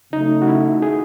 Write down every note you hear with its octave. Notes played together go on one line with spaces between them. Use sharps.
C#3 F#3 A3 D#4
F#4
E4
G#4